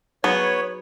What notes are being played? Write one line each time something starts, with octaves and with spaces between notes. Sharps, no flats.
F#3 B3 D#4 G#4 B4 C#5